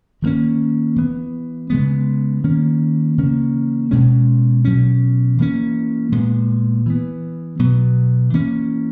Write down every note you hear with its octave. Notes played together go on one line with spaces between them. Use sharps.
D#3 F#3 A#3 C#4
E3 B3
C#3 G#3 B3
D#3 A#3 C#4
C#3 E3 A#3 C#4
B2 G#3 C#4
B2 F#3 C#4
E3 A#3 C#4
A#2 G#3 B3
E3 B3
B2 F#3 B3
E3 A#3 C#4